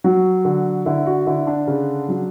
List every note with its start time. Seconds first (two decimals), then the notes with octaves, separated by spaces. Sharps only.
0.04 F#3 F#4
0.45 D3
0.86 D3 E4
1.06 F#4
1.27 D3 E4
1.47 D4
1.67 C#3
2.09 F#3